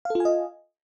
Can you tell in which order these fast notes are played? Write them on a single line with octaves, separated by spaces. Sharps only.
F5 A4 F4 G#5 D#5